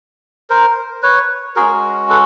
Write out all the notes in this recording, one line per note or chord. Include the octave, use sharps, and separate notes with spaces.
A#4 C5
B4 C#5
G#3 C#4 F#4 G#4 A#4
A4 B4